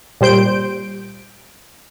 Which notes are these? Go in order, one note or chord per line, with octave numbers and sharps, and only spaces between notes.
A#2 G3 C5 G6 D7